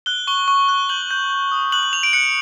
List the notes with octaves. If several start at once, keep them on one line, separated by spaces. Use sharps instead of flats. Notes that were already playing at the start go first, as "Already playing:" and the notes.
F#6 G7
C#6 G7
C#6
F#6
G6 F#7
G6
G6
D#6
F#6 F#7
F#7
F#6 F7
D7
F#6 C#7